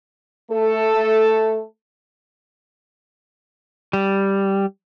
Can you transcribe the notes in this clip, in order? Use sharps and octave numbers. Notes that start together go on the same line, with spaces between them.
A3 A4
G3